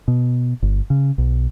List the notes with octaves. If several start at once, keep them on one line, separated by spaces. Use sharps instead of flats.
B2
G1
C#3
B1